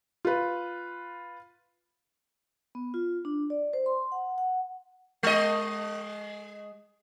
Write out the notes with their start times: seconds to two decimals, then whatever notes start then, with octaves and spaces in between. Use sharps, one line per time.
0.25 F4 B4
2.75 B3
2.94 F4
3.25 D4
3.50 D5
3.73 C5
3.86 C6
4.12 F#5
4.38 F#5
5.23 G#3 D#5